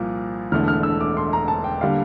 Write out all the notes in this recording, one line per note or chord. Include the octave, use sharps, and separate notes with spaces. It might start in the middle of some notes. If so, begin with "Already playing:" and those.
Already playing: C2 A#2 F3 A#3
E1 E2 D3 A3 F6
F6
E6
D6
C6
A#5
A5
G5
D3 G3 A#3 F5